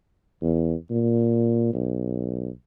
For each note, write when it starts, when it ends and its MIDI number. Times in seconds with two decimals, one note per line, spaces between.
0.42 0.74 40
0.91 1.71 46
1.73 2.49 35